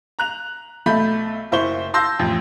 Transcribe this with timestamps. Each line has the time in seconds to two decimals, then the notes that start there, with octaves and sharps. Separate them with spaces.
0.19 A#5 F#6 F7
0.86 B1 A3 B5 G6
1.52 F#1 E4 C5 C#6 G7
1.94 A5 C6 E6 G6 A#6
2.19 A1 F2